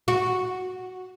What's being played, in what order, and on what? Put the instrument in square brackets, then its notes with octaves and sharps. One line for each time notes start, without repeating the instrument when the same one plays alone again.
[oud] F#4